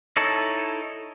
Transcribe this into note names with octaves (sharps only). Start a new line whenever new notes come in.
D#4 E4 A4 C#5 A5